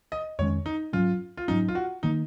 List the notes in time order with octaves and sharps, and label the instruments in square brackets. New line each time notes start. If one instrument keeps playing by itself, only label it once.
[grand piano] D#5
[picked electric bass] F2 D#3 G#3 C#4 [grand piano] C#5
[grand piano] D#4
[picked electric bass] G#2 F#3 C#4 [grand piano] F4
[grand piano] F4
[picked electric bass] G#2 F#3 C#4 [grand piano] D#4
[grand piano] F4
F#4
[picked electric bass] D#3 A#3 [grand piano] D#4